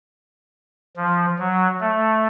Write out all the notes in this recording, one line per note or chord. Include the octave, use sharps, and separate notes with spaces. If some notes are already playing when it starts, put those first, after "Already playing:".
F3
F#3
A3